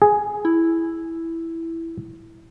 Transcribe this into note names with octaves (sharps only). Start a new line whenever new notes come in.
G#4
E4